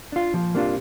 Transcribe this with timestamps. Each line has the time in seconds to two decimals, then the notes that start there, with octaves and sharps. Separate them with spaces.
0.12 D4 F4
0.34 A#2 F3
0.54 G2 C3 A#3 D4 F4